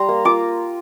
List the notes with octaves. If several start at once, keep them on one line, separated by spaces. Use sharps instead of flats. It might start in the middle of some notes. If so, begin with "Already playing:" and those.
Already playing: G3 A#5 C6
A#3
F4 D6